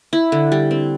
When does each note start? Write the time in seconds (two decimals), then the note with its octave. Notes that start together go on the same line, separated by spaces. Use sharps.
0.13 E4
0.32 D3
0.52 G3
0.71 C4